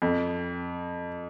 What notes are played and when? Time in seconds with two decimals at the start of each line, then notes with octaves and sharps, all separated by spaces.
0.02 F2